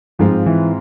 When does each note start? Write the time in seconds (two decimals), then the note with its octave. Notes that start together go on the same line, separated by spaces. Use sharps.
0.19 G#2 F3 G#3 C4 F4
0.46 E3